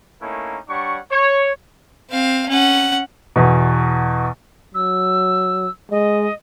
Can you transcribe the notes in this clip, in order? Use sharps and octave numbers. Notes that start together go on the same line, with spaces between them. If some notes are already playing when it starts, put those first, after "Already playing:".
A3 A#3 C#4 D#4 E4 A#4
G3 D4 C#5 F#5 C#6
C#5
C4 F5
C#4 F#5
E2 B2
F#3 E6
G#3 D#5